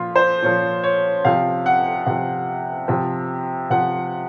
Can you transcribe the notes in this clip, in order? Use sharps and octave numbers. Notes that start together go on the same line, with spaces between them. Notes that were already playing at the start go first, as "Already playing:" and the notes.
Already playing: A#2 F3 F4
C5
A#2 F3 C#5
C#5
C3 F3 F5
F#5
C3 F3
C3 F3
C3 F3 F#5